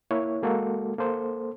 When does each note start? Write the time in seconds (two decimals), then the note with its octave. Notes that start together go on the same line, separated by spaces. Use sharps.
0.11 A#3 E4 C#5
0.43 G#3 A#3 F#4 A4
0.98 A#3 A4 C5